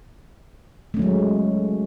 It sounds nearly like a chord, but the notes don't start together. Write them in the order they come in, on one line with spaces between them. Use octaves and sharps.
A3 C#4 F#3 G#3